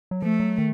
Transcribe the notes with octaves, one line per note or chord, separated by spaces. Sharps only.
F#3
F3 A3
F#3
D#3